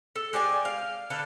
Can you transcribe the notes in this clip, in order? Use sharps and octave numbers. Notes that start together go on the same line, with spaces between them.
A4
G#3 G4 D5 G#5
F5
D3 A4 B4 F5